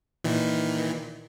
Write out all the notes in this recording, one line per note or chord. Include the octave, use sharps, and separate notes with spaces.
A#2 D#3 E3